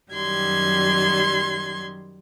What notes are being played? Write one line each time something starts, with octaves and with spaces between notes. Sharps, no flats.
F#2 D#3 F#3 G3 C6 G#6